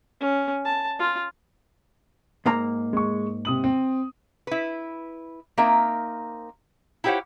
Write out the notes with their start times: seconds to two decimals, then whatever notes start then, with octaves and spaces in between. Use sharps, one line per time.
0.21 C#4
0.65 A5
0.99 F4
2.46 G#2 A#3 A#5
2.93 G#3 C#6
3.45 C3 D#6 F#7
3.64 C4
4.47 E4 B4
5.58 A#3 C4 D#4 A#4 E5
7.04 E4 F4 G4 C5 C#5 F#5